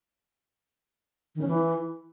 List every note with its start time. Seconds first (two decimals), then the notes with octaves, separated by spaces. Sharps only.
1.35 D#3
1.41 C#4
1.48 E3